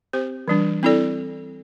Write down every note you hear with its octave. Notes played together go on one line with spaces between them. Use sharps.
C4 G4 C5
E3 G3 D4
C4 E4 A4 D5